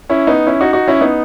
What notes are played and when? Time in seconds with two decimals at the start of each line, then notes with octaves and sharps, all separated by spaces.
0.10 C#4 E4
0.27 B3 D#4
0.47 C#4 E4
0.61 D#4 F#4
0.73 D#4 F#4
0.88 C#4 E4
1.01 B3 D#4